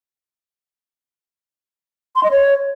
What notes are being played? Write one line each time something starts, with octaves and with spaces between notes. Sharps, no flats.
C6
D#5
C#5